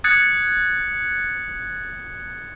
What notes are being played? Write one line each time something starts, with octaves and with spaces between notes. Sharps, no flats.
D#6 F#6 G#6 A6 C#7